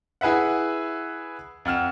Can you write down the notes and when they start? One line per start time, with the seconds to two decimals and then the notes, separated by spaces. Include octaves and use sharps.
0.21 E4 G#4 B4 E5 F#5
1.65 F2 F#5 F6 E7